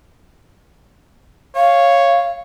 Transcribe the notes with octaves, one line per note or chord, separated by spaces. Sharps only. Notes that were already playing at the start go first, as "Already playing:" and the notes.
C#5 F5